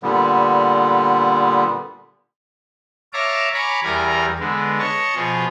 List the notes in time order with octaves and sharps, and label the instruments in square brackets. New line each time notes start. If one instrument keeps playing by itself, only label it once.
[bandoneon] A#2 D3 G3 B3
[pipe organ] C#5 E5 F5 A5 A#5 D6
C#5 G#5 A#5 B5 C#6 D6
E2 G3 A#4 G#5 A#5
D3 G#3 B3
C#5 D#5 A5 C#6
B2 F3 F4 G#4